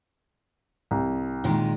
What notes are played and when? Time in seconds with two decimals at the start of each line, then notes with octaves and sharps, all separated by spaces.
0.91 C2
1.44 A#2 D#3 G#3